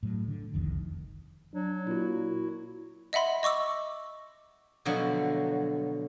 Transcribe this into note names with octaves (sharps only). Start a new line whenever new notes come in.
A2 F#3
D3
F1 C2 F2 D#3
F#3 D4
A#2 E4 F#4
D#5 E5 F#5 B5 C6
D#5 C#6 D6 E6
B2 D3 F3 F#3